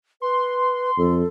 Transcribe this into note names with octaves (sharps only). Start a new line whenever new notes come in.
B4 C6
F2 A4